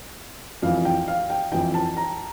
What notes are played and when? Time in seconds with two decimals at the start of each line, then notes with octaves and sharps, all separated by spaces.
0.62 F2 E3 F5
0.85 G5
1.08 F5
1.30 G5
1.52 F2 E3 G5
1.74 A5
1.97 A#5